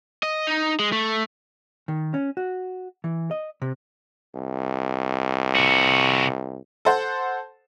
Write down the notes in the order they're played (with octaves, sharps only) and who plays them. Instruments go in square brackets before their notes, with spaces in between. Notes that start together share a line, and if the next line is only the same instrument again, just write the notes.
[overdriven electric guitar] D#5
D#4
G#3
A3
[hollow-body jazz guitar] D#3
C#4
F#4
E3
D#5
C3
[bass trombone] C2
[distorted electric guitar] C3 F#4
[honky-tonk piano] A4 C5 F#5